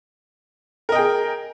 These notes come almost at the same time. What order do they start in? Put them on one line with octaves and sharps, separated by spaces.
A#4 D#5 G5 G#4